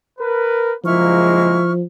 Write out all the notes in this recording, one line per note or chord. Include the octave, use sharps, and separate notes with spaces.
A#4 B4
F#1 F3 G#3 A#3 E4 C#6 F6